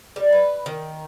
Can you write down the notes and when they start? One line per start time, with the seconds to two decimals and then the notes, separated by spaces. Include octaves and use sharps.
0.16 G3
0.32 B4
0.66 D#3